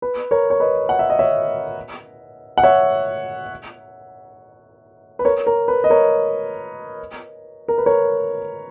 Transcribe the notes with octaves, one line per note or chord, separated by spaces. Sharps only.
B4
A#4 C#5
C#5
B4 D#5
F#5
E5
D#5
C#5 E5
F#5
C#5 E5
B4
A#4 C#5
A#4
B4
D#5
A#4 C#5
A#4
B4
A#4 C#5